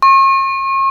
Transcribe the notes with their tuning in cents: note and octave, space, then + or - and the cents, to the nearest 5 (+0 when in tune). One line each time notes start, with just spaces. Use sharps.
C#6 -40